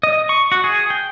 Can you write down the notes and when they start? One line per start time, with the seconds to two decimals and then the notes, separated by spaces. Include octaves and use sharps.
0.03 D#5
0.29 C#6
0.52 F#4
0.64 G#4
0.90 G5